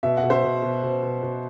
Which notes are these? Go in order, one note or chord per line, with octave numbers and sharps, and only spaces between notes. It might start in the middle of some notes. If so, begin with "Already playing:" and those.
B2 E5
F#5
B2
C5 E5
B2
B2
B2
B2
B2